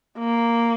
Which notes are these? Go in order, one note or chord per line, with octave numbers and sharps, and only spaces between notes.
A#3